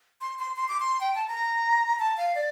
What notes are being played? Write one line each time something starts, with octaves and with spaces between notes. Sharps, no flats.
C6
C6
C6
D6
C6
G5
A5
A#5
A5
F5
D5